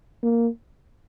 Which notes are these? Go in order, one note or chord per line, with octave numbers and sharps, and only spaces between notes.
A#3